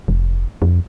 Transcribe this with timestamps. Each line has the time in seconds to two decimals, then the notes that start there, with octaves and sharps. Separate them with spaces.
0.08 F1
0.62 F2